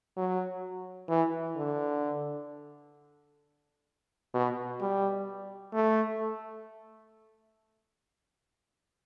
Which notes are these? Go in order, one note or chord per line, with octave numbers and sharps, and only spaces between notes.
F#3
E3
D3
B2
G3
A3